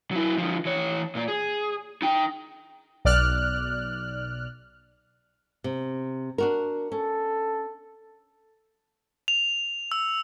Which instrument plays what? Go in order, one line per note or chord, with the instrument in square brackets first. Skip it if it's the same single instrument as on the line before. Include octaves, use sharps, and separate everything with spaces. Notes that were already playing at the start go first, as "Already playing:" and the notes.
[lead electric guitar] F#3 E4
D3 F3
E3 C#5
A#2 A#3
G#4
D#4 G5
[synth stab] B1 D5 F6 F#6
[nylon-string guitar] C3
D4 F#4 A#4
[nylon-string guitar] C#4 [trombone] A4
[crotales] F7
E6